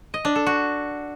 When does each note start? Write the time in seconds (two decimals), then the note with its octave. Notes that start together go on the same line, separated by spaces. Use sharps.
0.14 D#5
0.25 D4
0.36 A4
0.46 F#4